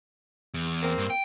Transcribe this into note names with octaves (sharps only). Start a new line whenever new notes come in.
E2
A#3 C4
G2
G5